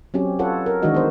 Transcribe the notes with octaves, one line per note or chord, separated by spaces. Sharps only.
F#3 C4 C#4 G4
F4 A4 B4 C#5 F#5
A#4
D#3 E3 G#3 D4 F#4 D#5
B3 C5